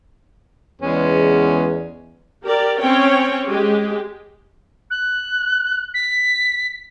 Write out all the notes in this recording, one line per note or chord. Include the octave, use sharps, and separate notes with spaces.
E2 G#3 B3 C#4
G4 A#4 D5
C4 C#4 C#5 G5
G#3 G4
F#6
B6